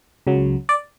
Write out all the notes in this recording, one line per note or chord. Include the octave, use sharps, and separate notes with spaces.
C#2 C#3 F#3
D5